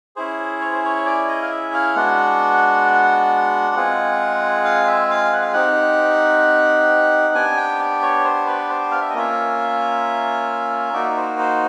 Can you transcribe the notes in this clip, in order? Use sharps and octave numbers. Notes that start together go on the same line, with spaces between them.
C#4 E4 G#4 C5
C#5
C5
C#5
D5
D#5
F5
E5
F5
G#3 B3 D4 F#4 F#5
G#3 C4 F4 G#4
F5
E5
F5
F#5
F5
C4 D#4 G4 F#5
B3 D4 G4 G#5
G5
D5
C#5
C5
B4
C5
F5
E5
D#5
A#3 C#4 F4 E5
A#3 D#4 F#4 D5
C5
C5